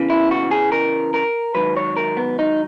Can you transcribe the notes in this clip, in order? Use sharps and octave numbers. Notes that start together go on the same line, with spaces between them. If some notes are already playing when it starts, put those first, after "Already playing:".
Already playing: E2 C#3 E3
E4
F#4
G#4
A#4
A#4
G#2 D#3 F#3 B4
C#5
A#4
B3
D#4